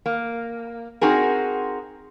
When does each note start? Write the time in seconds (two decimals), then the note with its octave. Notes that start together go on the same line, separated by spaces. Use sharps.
0.06 A#3
1.01 C4 D#4 F#4 G#4 A#4